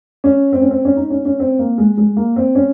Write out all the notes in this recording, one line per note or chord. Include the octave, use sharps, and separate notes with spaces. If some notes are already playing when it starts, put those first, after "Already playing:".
C#4
C4
C#4
C4
C#4
D#4
C#4
C#4
C4
A#3
G#3
G#3
A#3
C4
C#4